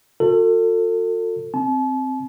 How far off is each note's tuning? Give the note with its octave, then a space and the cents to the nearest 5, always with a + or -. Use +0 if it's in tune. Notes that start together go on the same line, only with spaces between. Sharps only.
F#4 -45 A4 +35
C4 +0 A5 -40